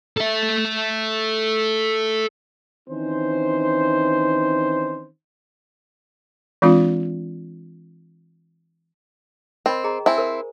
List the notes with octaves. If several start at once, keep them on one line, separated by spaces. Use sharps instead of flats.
A4 E5
D#3 E3 C4 C#4 D#4 C5
E3 G#3 C4 D4 F4
C4 A#4 D#5 B5
G#4 D#5 A#5
C4 E4 C5 G#5
A#4 C5